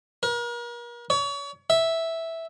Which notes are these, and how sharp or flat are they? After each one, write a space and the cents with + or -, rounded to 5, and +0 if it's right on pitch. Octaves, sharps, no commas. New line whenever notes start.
A#4 +40
C#5 +35
E5 -5